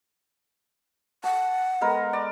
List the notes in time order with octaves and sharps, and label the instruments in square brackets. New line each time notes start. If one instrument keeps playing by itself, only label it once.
[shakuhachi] F#5 [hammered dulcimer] A5
[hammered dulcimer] G#3 B3 A#4
D5